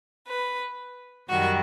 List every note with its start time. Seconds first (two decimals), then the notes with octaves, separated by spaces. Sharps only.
0.27 B4
1.29 F#2 D#3 G3 F#4